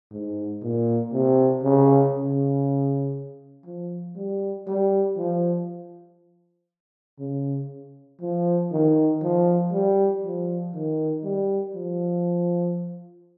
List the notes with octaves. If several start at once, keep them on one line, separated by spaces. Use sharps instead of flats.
G#2
A#2
C3
C#3
C#3
F3
G3
G3
F3
C#3
F3
D#3
F3
G3
F3
D#3
G3
F3